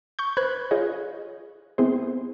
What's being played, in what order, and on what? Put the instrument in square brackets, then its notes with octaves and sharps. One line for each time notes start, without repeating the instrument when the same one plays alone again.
[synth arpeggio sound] C#6 G6
B4 C5 B5 F#6 G#6
F4 G#4 C#5 D#5
B3 C4 E4 G#4 C5